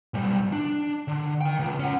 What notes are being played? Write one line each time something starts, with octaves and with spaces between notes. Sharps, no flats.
B1 G3
D4
D3
D#3 G5
C#2
C#4 F#5